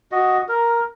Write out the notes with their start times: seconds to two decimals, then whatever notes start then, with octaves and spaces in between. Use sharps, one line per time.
0.12 F#4 D#5
0.49 A#4